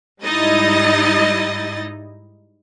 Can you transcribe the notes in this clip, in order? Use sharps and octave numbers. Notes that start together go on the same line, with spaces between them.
G#2 G3 D#4 E4 D#5 A6